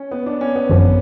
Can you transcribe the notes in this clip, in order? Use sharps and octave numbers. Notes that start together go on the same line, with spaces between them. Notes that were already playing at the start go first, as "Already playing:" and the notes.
Already playing: C#4
B3
D4
C#4
B3
G#1 F#2 F3